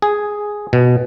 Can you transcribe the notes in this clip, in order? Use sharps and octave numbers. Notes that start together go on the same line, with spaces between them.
G#4
B2